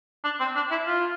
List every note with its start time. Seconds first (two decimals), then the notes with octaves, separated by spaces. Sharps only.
0.24 D4
0.40 C4
0.55 D4
0.71 E4
0.86 F4